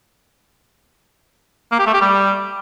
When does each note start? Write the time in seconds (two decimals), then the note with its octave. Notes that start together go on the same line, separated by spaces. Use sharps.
1.72 A#3
1.79 G4
1.86 A3
1.94 G4
2.01 G3